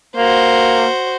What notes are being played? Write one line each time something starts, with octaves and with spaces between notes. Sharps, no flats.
A#3 F#4 C5